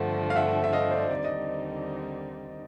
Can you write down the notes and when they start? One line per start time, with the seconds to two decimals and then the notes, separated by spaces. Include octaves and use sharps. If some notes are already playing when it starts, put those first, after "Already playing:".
Already playing: G2 D3 F3 A3 C4 E5 F#5
0.30 F5
0.35 E5 F#5
0.64 E5
0.73 D#5 F5
0.91 C5 D5
1.11 D#2 D3 G3 C4 D#4 D5
1.24 D#5